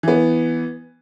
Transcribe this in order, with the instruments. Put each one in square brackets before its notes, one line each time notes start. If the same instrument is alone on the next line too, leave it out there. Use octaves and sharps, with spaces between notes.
[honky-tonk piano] E3 B3